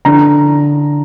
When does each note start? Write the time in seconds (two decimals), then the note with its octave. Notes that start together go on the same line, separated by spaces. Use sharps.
0.05 D3 A#5